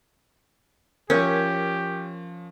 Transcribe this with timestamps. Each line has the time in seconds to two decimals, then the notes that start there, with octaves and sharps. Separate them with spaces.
1.10 F3 C#4 G4 A#4 C#5 E5 G6